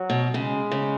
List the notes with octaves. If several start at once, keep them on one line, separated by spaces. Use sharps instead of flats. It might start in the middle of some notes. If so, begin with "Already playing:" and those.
Already playing: F#3
B2
C#3 G#3
C#3